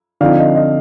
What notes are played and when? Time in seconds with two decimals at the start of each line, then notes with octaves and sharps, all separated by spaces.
0.21 D3 F3 C4 D#4 D5 F5
0.38 D#5
0.55 D#5